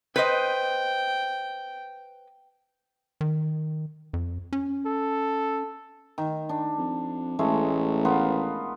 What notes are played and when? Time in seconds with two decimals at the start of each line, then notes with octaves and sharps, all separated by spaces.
0.16 B4 C5 D#5 G5
3.21 D#3
4.13 F2
4.53 C#4
4.86 A4
6.18 D#3
6.49 D4
6.78 F2
7.39 A1 G#3 A3
8.05 B3 F4 A#4